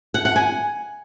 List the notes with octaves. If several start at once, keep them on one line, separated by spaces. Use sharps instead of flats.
F#5
F#5
G#5